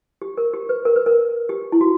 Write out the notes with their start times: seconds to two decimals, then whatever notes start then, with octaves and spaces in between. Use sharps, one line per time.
0.22 G4
0.38 A#4
0.54 G4
0.69 B4
0.85 A#4
0.96 B4
1.06 A#4
1.49 G4
1.72 E4
1.81 F#4